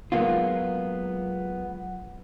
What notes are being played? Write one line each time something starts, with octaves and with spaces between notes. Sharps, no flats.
F#3 G#3 A#3 B3 F4